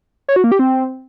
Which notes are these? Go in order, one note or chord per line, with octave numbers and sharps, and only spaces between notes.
C#5
F#4
A#3
G4
C4